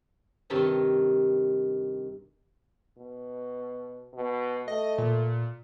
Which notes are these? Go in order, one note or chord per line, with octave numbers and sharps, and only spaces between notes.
G2 C3 D#3 C#5 D#5 A5
B2
B2
A3 D#5
A#2